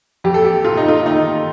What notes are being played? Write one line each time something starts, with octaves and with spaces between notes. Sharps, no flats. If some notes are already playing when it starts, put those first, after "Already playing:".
F2 G4
A4
G4
C3 F4
D#4
F4
D#3 D#4